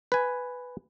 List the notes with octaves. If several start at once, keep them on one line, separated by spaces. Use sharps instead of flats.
B4 G#5